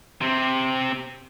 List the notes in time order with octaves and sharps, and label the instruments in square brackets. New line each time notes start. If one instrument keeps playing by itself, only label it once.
[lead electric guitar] C3 C4